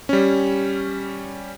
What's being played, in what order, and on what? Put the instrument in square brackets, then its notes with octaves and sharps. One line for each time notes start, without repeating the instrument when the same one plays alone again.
[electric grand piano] G3 C#4